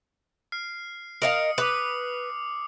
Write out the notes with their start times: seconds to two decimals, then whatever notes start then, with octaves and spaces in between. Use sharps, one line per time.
0.52 F6 C7
1.22 A#4 D#5 F5 D#6 C#7
1.58 B4 D6 D#6